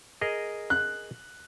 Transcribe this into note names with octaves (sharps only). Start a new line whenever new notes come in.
G#4 A#4 D#5
F#6